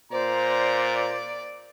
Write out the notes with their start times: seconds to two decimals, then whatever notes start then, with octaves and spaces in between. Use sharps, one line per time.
0.12 A#2 C5 D5 A#5